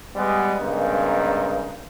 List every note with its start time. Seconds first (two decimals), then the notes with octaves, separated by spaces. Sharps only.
0.16 G3 G#3 B3
0.60 G2 C#3 G#3 A#3 B3 D#4